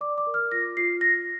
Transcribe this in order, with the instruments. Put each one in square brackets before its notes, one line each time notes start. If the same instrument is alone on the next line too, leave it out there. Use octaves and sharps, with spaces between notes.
[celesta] D5 D6
D6
A#4
F6
F4 A#6
F4 C7
F4 A#6